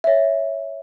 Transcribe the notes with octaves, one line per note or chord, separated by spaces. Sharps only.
C#5 E5